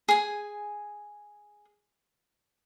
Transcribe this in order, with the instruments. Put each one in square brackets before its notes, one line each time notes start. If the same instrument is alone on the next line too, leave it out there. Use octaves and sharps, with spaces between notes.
[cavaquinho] G#4 G#5